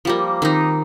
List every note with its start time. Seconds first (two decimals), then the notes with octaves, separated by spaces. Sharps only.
0.05 F3 G3 A#3
0.42 D#3 C4 D#4